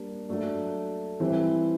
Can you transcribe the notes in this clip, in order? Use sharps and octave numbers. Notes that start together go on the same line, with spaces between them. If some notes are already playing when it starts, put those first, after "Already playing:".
Already playing: G3 A#3 D4
F#3 A3 D4
E3 G3 C4 E4